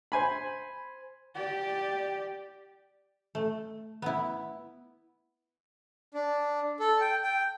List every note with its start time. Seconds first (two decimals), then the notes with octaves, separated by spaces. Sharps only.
0.12 C5 G#5 B5
1.35 G4 D5
3.35 A3
4.02 B3 E4
6.14 D4
6.80 A4
7.01 G5
7.23 G5